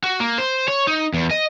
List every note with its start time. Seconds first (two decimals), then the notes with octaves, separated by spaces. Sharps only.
0.04 F#4
0.20 A#3
0.38 C5
0.68 C#5
0.87 D#4
1.14 E2
1.31 D#5